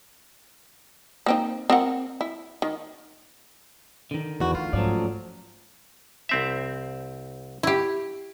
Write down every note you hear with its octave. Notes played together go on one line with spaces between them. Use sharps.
A#3 C4 D#4
C4 A#4 F#5
E4
D#3
D3 D#3
E2 F#4
D2 F4
G#2 F3 F#3 A3 C#4 D5
C2 C4 E5
E4 G4